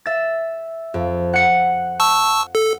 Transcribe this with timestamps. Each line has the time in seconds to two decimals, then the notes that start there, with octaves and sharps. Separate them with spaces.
0.06 E5 A6
0.94 F2
1.33 F#5 C#7
2.00 A5 C#6 E6
2.55 A4